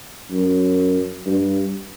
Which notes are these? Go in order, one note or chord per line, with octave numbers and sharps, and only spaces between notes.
F#2
G2